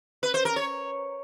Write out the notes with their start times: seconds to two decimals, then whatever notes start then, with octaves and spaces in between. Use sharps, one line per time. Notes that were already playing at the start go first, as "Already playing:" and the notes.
0.23 B4
0.34 C5
0.45 A#4
0.56 C#5